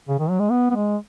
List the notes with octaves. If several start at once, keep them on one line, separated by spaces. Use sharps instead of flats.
C#3
D#3
F#3
G#3
B3
B3
G#3